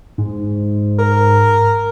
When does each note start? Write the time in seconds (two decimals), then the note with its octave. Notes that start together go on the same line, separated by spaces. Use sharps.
0.18 G#2
0.99 A#4